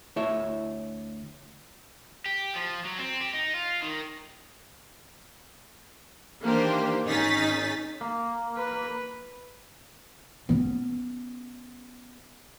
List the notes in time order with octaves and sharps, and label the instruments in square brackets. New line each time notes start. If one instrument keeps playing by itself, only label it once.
[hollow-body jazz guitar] D2 E4 C#5 E5
[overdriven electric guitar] G4
F3
F#3
C4
G4
D#4
F4
D#3
[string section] D#3 E3 A#3 D4 G4 C5
G#1 C#4 D#4 G#4 A6 B6
[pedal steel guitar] A#3
[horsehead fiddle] B4
[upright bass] B3 C#4